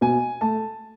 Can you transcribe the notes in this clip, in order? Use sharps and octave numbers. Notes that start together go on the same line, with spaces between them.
B2 G#5
A3 A5